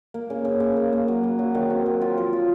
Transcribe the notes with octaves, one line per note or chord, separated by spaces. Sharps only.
A#3
C#3
C#3
C#3
A#3
A#3
F#3
F#3
F#3
D#3
C4
F#3
F4
F3
F4